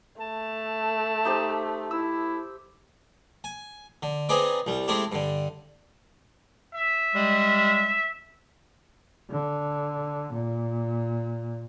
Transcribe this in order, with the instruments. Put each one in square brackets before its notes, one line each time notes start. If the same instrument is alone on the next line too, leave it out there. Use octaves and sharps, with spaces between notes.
[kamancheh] A3 [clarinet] A5
[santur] D#4 G4 C5
[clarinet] E4 [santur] E6
[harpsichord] G#5
D3
C4 D#4 G#4 B4 D5
C2 G3
G#3 A3 C4 E4 G4
G2 D3
[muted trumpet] E5
[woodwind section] G3 G#3
[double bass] D3
A#2